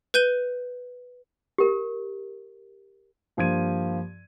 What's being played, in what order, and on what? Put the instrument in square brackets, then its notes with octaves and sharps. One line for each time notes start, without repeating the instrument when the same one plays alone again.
[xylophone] B4 G6 D#7 G7
[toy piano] G4 A#4
[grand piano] G2 F3 A#3 G#6 D#7